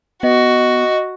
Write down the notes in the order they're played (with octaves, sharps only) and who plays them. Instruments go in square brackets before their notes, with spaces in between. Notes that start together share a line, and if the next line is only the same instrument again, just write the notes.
[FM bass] B3 [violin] F#4 [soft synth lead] D#5